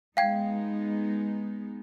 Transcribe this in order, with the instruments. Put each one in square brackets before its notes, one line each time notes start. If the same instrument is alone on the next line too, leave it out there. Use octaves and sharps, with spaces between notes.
[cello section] G#3 B3 D#4 [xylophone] F5 G5 G#6